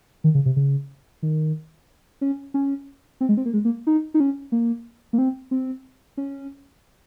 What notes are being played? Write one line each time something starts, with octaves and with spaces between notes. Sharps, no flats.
D#3
C#3
C3
C#3
D#3
C#4
C#4
C4
G#3
C4
A#3
G#3
A#3
D#4
D#4
C#4
A#3
A#3
C4
C4
C#4